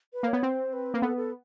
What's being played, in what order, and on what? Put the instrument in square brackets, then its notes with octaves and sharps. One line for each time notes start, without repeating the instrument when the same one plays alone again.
[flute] B4
[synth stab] A#3
[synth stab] B3 [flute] C#5
[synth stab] C4 [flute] C5
[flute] B4
[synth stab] A#3
[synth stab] B3 [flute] A4
[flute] A4